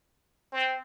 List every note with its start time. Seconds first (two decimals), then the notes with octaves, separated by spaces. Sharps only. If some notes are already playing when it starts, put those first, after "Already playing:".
0.53 C4